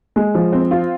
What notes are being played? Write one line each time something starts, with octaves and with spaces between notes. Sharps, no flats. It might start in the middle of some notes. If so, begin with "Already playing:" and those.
G#3
F3
C4
F4